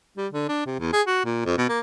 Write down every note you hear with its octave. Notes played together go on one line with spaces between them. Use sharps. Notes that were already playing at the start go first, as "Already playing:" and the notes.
G3
D3
D4
C3
E2
G#4
F#4
A#2
F2
B2
A#3